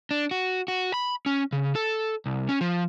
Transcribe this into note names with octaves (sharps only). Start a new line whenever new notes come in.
D4
F#4
F#4
B5
C#4
C#3
A4
C2
C#4
F3